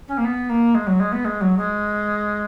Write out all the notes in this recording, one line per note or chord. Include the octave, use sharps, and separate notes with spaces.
C#4
A#3
B3
A#3
G#3
F#3
G#3
B3
G#3
F#3
G#3